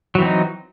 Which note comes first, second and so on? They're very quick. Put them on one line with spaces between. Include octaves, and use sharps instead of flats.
F#3 E3 C4 D#4